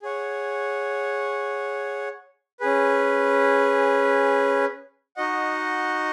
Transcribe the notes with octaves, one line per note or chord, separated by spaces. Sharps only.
G#4 C#5 F#5
C#4 G#4 B4
D#4 F#4 D#5 F#5